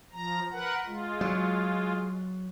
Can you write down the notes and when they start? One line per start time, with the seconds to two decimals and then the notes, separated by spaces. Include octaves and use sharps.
0.13 F3 A#5
0.51 A#4 B4 F#5
0.86 G#3 F4
1.21 F#3